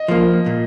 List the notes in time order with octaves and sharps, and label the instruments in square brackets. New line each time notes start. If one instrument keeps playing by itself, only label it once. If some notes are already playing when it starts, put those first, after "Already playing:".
Already playing: [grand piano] D#5
[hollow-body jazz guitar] F3 A#3
A#2